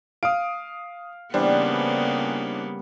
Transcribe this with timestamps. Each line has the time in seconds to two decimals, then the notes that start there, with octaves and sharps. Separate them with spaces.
0.23 F5 D#6 D7
1.34 C#3 E3 G3 A#3 B3 D4 C5